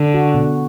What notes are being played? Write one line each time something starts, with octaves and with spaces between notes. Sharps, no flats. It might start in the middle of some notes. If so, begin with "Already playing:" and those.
Already playing: D3
F#4
B2